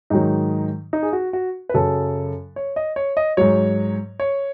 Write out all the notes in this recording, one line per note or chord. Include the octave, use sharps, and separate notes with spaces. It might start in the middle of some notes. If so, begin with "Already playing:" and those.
G#2 D#3 F#3 D#4
D#4
G#4
F#4
F#4
B4
F#2 C#3 F#3 A4
C#5
D#5
C#5
D#5
G#2 F#3 C#5
C#5